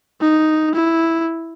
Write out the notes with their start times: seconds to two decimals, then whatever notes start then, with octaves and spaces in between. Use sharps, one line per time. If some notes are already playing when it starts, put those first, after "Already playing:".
0.21 D#4
0.74 E4